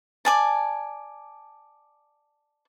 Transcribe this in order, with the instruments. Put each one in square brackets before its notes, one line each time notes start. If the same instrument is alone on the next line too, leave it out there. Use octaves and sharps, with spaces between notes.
[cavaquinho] D5 G#5 A5